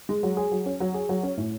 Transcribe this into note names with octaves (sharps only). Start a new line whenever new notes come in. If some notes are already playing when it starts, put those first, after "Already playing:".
G#3
F#3
G#4
F#3
C#4
F#3
G#4
F#3
C#4
A2